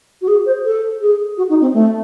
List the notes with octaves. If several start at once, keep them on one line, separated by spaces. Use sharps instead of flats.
F#4
G#4
C5
A4
G#4
F#4
D#4
C4
A3